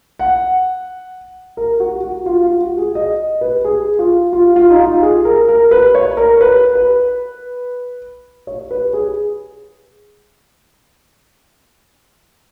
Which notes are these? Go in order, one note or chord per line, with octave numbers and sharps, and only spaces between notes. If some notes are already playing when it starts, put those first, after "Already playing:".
F#5
A#4
F#4
F#4
F4
F4
F#4
G#4
D#5
B4
G#4
F4
F4
F4
D#4
F4
G#4
A#4
A#4
B4
C#5
A#4
B4
B4
C#5
B4
G#4